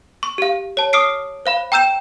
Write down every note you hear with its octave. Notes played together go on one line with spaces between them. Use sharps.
C#6
G4 F5
C#5 A5
D6 D#6 F6 C7 D7
C5 F5 B5
G5 A#5 E6 G6 E7